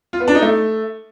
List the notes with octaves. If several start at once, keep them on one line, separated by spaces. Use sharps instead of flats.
F4
B3
D4
D#4
A3